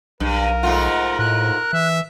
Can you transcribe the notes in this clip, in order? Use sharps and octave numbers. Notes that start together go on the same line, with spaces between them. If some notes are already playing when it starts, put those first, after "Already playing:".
B1 G2 A#4
G#2 A3 F4 F#5
A2 F#6
E3 E5